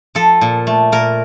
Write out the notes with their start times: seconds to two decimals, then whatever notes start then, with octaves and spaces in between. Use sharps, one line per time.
0.15 F3 A4
0.41 A#2
0.67 A3
0.92 A#2 A#4